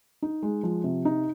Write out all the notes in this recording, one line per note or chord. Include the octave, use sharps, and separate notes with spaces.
D#4
G#3
F3
C3
D#4